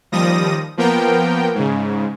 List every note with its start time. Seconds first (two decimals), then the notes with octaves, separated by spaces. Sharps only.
0.12 D#2 F3 G3 D#6 A#6
0.77 F3 A#3 B3 A#4 G5
1.55 G#2 C#3